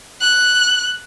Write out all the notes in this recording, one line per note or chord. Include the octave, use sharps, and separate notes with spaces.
F#6